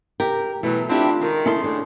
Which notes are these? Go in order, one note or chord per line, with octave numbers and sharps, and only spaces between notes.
G4 A#4
B2 E3 F#3 A3
C4 D4 E4 F4 G4
D#3 G#3
C#4 E4 G#4 A4 C6
A2 D4